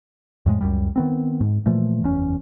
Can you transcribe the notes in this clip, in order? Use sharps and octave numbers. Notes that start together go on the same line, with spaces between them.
F2 A2 G#3
C#2 F#2 G3
D#3 B3 C4
G#2
A#2 E3 F3 A3
F#1 E2 C#4